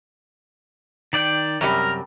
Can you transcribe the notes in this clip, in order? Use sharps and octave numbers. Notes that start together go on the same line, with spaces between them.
D#3 D5 G5
F#2 C3 G3 A#4